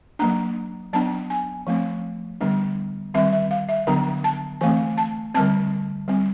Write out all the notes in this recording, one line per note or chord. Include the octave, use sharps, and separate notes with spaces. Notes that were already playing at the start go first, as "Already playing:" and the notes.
F#3 A#3 D4 A#5
F#3 B3 D4 A5
G#5
F3 A3 C4
D3 G3 B3 D4
D#3 G3 C4 E5
E5
F5
E5
D3 F#3 B3 D4 A#5
A5
E3 A3 C4 G#5
A5
D3 G3 C4 A5
G3 C4